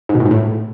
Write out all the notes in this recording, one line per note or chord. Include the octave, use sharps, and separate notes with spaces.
G#2
B2
A2
G#2
A2